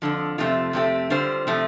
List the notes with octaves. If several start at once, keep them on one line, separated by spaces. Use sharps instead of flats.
F2 D3 F3
F2 C3 F3 A3 F4
F2 C3 A3 C4 G4
D3 G3 F4 C5
C3 F3 A3